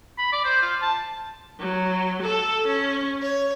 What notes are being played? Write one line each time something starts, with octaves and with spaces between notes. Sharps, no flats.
B5
D5
C5
F4
A5
F#3
A4
C#4
C#5